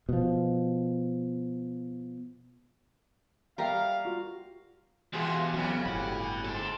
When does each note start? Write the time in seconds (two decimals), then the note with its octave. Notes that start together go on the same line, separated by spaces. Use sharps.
0.09 B2 F3
3.58 G3 A#4 E5 F5 G5 A#5
4.05 F4 F#4
5.13 E2 B2 E3 F4 G4 G#4 F#5 G#5
5.54 F2 C#3 F#3 B4
5.86 G1 A2 F#4 B5
6.44 G#2 C4 A4